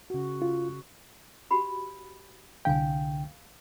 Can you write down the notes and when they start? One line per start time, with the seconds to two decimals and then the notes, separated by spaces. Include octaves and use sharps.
0.10 C#3 F#4
0.42 F4
1.51 F#4 G4 B5
2.65 C2 D3 F5 G5 G#5